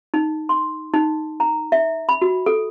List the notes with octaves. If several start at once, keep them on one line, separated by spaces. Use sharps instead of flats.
D#4
C6
D#4
A#5
E5
B5
F#4
A4